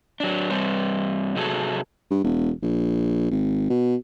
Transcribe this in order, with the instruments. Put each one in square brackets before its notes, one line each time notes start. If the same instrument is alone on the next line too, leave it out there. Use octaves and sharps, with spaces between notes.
[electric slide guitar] F#3 D4
G2 G3 C4 C#5
C3 F#3 F#4 G#4 A4
[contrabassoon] G2
E1
A#1
G#1
B2